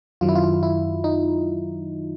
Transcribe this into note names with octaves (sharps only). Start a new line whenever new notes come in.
F#2 D#3 F#3 F4
E4
F4
E4
D#4